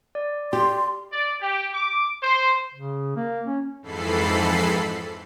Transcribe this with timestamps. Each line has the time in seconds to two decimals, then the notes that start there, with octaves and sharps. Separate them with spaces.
0.15 D5
0.53 G4 C6
1.13 D5
1.42 G4
1.74 D6
2.23 C5
2.74 C#3
3.16 A#3
3.47 C#4
3.82 F2 G#2 E3 A4 B5 C7